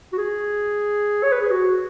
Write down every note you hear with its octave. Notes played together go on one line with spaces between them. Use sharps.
F#4
G#4
C#5
B4
G#4
F#4